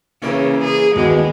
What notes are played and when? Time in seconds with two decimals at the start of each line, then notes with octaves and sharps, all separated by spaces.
0.22 C#3 E3 A#3 C#4
0.64 G#4
0.96 D#2 B2 E3 G#3